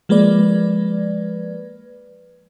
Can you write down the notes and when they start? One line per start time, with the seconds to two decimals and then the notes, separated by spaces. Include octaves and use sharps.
0.09 F3 G#3 A#3 B4 D5